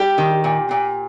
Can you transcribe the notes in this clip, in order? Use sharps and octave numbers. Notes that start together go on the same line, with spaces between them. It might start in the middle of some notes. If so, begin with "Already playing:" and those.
Already playing: G3 G4
D#3
A#2
A#2